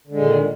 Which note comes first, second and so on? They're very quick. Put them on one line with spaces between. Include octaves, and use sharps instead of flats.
D3 G#3 A#2 D#3